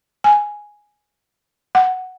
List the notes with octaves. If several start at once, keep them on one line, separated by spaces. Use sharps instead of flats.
G#5
F#5